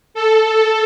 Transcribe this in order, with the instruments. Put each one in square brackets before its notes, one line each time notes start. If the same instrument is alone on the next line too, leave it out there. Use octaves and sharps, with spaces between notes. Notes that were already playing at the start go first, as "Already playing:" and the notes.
[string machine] A4